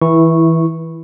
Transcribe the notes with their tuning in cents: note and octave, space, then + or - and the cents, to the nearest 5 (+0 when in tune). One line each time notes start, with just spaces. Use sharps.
E3 -20 E4 +0 C#6 -10